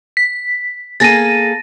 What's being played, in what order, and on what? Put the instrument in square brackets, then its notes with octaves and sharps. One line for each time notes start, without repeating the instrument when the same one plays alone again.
[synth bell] B6
[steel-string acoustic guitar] A#3 G#4 A4 [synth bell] A6 A#6 D#7